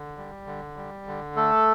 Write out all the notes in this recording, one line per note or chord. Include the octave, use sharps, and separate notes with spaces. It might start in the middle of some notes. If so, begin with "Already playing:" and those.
Already playing: D3
G3
D3
G3
D3
A3 A4